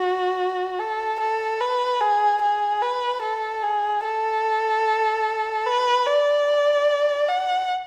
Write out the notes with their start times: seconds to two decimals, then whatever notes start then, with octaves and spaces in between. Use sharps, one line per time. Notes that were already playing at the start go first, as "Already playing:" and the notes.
Already playing: F#4
0.79 A4
1.20 A4
1.60 B4
2.01 G#4
2.42 G#4
2.82 B4
3.22 A4
3.63 G#4
4.04 A4
5.66 B4
6.06 D5
7.28 F#5